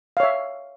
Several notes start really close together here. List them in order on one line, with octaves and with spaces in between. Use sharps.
F5 C#5 E5